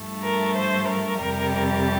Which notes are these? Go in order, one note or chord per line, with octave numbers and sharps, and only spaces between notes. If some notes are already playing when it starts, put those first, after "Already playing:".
Already playing: G2 F3 A3
A#4
C5
A#4
F2 C3 G3